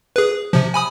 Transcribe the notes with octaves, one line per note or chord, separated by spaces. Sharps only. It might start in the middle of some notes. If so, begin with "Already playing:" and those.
G#4 B4
C3 F3
G#5 B5 D#6